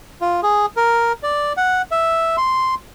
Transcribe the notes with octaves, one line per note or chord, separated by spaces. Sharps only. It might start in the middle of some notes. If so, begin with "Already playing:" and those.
F4
G#4
A#4
D5
F#5
E5
C6